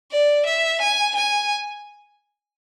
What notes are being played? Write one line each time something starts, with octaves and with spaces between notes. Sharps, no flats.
D5
E5
G#5
G#5